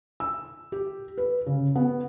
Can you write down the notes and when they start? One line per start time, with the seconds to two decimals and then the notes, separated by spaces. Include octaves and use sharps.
0.20 E6
0.72 G4
1.18 B4
1.46 C#3
1.76 B3